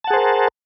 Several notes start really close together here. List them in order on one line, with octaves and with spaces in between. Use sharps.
A5 F#5 G#4 C5 A#4